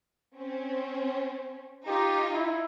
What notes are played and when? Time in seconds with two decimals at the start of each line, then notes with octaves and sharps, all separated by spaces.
0.36 C4 C#4
1.87 D#4 F4 G4
2.34 E4